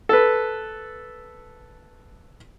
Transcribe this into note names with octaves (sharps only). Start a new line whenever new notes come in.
A4 B4